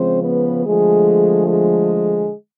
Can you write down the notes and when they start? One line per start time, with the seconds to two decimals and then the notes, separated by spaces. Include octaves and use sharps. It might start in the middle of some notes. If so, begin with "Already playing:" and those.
Already playing: C#3 F3 G#3 C4 C5
0.24 B3 B4
0.65 D3 F3 G#3 A3 G#4
1.47 G#3 G#4